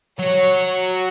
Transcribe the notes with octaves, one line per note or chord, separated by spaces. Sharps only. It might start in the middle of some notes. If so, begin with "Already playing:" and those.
F#3 C#5